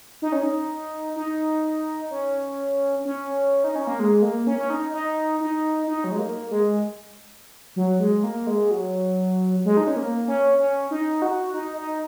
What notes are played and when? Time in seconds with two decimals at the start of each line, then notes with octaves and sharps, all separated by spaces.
0.22 D#4
0.32 C#4
0.43 D#4
1.16 D#4
2.10 C#4
3.05 C#4
3.64 D#4
3.75 C#4
3.87 A#3
3.99 G#3
4.22 A#3
4.47 C#4
4.59 C#4
4.70 D#4
4.93 D#4
5.41 D#4
5.87 D#4
6.04 F#3
6.12 G#3
6.19 A#3
6.51 G#3
7.76 F#3
8.00 G#3
8.24 A#3
8.47 G#3
8.71 F#3
9.65 G#3
9.77 D#4
9.87 C#4
9.96 A#3
10.28 C#4
10.59 C#4
10.91 D#4
11.22 F#4
11.54 D#4
11.77 D#4